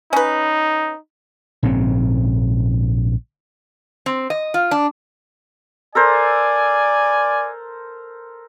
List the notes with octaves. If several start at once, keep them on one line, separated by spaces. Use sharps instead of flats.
C#4 D#4 B4
A#1 G#2 C#3 C4
C4
D#5
F4
D4
A4 A#4 C5 D5 G#5